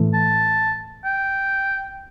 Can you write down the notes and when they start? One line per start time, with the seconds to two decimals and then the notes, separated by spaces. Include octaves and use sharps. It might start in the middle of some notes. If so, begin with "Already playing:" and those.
Already playing: A2 E3 A3
0.14 A5
1.05 G5